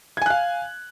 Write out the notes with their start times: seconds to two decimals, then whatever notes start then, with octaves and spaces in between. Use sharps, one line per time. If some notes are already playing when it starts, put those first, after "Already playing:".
0.17 G#6
0.22 G#5
0.26 F#6
0.30 F5